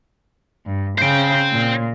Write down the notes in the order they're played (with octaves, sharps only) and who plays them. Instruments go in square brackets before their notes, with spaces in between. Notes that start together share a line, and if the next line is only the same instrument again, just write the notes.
[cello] G2
[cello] C#3 [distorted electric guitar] C5 G5
[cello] A#2